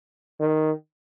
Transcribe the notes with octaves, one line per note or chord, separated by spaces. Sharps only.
D#3